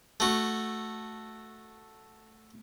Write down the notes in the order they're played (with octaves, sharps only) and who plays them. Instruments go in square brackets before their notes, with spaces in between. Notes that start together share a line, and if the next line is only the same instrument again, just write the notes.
[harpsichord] A3 F#4